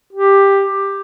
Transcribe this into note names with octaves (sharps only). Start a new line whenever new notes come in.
G4